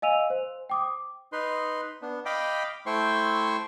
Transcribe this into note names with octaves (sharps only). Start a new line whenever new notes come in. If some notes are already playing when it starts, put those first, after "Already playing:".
D#5 F5 G#5 E6 D#7 F7
C5
G5 D6 D#6
D#4 B4 C6
B3 D4
D#5 F5 G5 B5 D6
A3 E4 C5 G5 C6 C#6